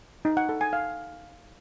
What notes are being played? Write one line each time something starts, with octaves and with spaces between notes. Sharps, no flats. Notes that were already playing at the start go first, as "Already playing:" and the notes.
D#4
F#5
A4
G#5
F5